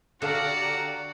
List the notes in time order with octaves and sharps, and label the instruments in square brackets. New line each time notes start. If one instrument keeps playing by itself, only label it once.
[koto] D3 [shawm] F#4 [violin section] G4 D5 A#5 [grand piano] A4 F5 A5